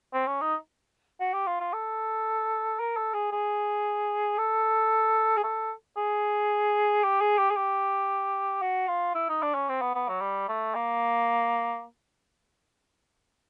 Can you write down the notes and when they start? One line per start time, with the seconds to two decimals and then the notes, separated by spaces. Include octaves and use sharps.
0.13 C4
0.27 C#4
0.41 D#4
1.20 F#4
1.33 G4
1.47 F4
1.60 F4
1.73 A4
2.80 A#4
2.97 A4
3.14 G#4
3.32 G#4
4.38 A4
5.37 G#4
5.44 A4
5.97 G#4
7.04 G4
7.21 G#4
7.38 G4
7.50 G#4
7.56 G4
8.62 F#4
8.88 F4
9.15 E4
9.29 D#4
9.42 D4
9.54 C#4
9.69 C4
9.81 B3
9.95 B3
10.08 F#3
10.21 G3
10.48 A3
10.75 A#3